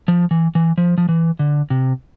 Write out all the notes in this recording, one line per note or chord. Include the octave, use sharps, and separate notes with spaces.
F3
E3
E3
F3
F3
E3
D3
C3